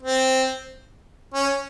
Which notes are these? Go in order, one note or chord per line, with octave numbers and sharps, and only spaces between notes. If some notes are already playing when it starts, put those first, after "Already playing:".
C4
C#4